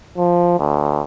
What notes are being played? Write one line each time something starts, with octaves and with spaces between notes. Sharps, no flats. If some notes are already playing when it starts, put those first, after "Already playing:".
F3
D2